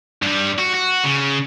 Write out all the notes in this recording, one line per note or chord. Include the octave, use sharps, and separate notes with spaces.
G2 G3
F#4
F#4
C#3